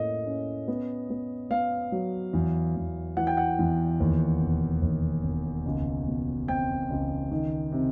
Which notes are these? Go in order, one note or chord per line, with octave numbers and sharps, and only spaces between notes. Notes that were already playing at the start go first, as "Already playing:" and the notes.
Already playing: A2 A#3 C#4 D#5
C#4
B3
B3
B3 F5
F#3
E2
E2
E3 F#5
G5
F#5
E2
D#2
E1
D#2
E1
C#2
B2
C4 G5
C#2
D#3
C3